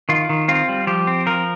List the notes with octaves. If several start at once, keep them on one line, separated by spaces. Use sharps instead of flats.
D#3 F4
D#3
C4 F4
G3
F3 G4
C4
F3 A#4